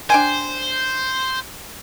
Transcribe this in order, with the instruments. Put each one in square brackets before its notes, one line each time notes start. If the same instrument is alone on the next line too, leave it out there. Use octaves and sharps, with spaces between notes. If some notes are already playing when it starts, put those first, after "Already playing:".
[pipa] D4 G5 G#5 [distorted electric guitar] C5